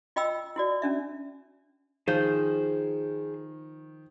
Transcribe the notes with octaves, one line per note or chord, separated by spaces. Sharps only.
F4 D#5 G5 B5 E6
E4 F#4 D5
C#4 D4 E5
D#3 F3 G#4 C5 G6